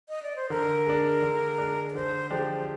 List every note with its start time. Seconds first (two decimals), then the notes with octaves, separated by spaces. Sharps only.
0.09 D#5
0.23 D5
0.36 C5
0.50 D3 A#4
0.86 G#3 D4
1.22 D3
1.58 G#3 D4
1.90 D5
1.95 D3 C5
2.30 F3 G#3 D4 G4 C5